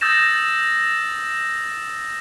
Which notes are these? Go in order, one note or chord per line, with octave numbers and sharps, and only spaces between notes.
D#6 E6 G6 A6 A#6 E7